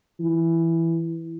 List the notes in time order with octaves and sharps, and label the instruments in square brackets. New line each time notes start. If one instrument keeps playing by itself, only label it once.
[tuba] E3